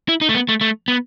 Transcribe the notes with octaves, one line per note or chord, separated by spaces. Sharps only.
E4
D#4
A3
B3
A3
A3
B3